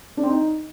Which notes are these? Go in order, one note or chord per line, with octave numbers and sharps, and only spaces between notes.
D4
C4
D#4